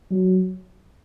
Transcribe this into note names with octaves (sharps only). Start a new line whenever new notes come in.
F#3